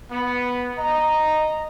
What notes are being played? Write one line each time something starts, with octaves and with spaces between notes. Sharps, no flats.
B3
D#5 A#5